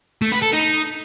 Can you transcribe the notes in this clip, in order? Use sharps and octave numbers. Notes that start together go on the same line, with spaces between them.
A3
B4
A4
D#4